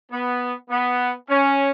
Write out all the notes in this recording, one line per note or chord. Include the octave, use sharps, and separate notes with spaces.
B3
B3
C#4